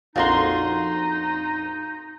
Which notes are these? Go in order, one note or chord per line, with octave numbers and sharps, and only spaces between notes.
A#1 F2 D#4 F4 F#4 A#5 C6